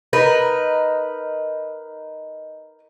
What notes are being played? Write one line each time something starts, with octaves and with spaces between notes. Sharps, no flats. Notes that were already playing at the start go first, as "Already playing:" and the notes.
D#4 A#4 B4